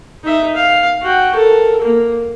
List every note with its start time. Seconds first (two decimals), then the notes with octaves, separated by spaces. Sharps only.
0.24 D#4 E5
0.56 F5
1.02 F#4 G5
1.35 A4 A#4
1.82 A#3